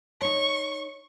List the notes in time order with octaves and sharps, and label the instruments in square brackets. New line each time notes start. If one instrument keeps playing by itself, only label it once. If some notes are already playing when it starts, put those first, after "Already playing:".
[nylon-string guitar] D#4 C#5 [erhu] C#6